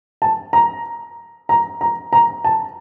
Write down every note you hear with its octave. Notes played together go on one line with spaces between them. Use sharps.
A5
A#5
A#5
A#5
A#5
A5